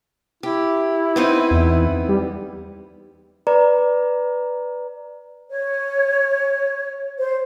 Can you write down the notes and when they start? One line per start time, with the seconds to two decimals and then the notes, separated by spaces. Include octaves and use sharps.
0.43 E4 G4
1.16 B3 C4 D#4
1.51 E2
2.09 G3
3.47 B4 D5 A#5
5.51 C#5
7.17 C5